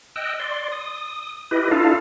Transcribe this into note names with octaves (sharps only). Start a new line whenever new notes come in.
D#5 G5 E6 F#6
D5 C6
D#6
E4 G4 B4 D#5
D4 E4 F4 A4 F5